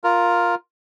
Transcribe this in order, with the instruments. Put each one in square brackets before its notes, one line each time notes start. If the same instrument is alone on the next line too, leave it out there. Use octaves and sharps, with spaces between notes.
[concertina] F4 A#4